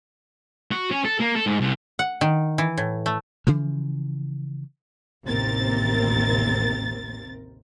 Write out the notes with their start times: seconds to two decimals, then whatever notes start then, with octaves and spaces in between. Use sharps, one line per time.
0.71 F#4
0.91 C#4
1.05 A4
1.20 A#3
1.35 A4
1.46 G#2
1.61 C2
1.99 F#5
2.21 D#3
2.58 E3
2.78 A2
3.06 A3
3.47 C#3 E3 F3
5.24 A1 D#2 C3 C4 A#4 A6